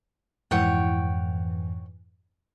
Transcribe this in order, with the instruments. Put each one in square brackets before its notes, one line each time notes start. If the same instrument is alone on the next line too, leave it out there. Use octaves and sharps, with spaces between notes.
[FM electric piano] F2 G#2 E3 [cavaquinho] C#5 F#5 G5